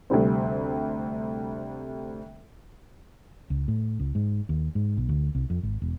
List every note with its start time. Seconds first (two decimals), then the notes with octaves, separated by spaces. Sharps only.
0.10 D2 C3 G3 C4
3.50 C#2
3.68 A2
3.99 C#2
4.15 G#2
4.49 D#2
4.75 G#2
4.98 B1
5.09 D2
5.35 C2
5.50 F2
5.63 G#1
5.82 E1